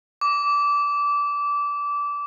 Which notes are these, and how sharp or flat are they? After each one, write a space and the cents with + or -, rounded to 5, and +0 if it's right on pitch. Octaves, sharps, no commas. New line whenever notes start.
D6 -20